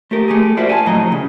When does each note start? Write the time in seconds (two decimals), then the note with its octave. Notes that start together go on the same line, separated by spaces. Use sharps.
0.11 A3 G4 A#4
0.28 A3 G4 G#4
0.57 F4 F#4 A#4 C5 D5 E5
0.69 G#5 A5
0.86 F2 A2 F#3 D#5 A#5
1.12 C#3